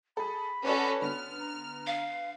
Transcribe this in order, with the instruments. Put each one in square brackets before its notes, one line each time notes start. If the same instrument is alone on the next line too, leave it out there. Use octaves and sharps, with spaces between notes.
[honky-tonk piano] G#4 A4 [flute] B5
[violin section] C#4 F#4 A4 [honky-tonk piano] B4 D5 F#5
[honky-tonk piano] D3 B3 [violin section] F6
[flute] A#5
[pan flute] F5